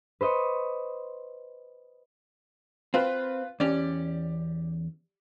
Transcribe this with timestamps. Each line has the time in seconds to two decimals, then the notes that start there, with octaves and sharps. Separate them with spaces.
0.21 B4 C5 D#5 C6 C#6
2.94 C4 F4 B4
3.60 E2 C#4 G4 D5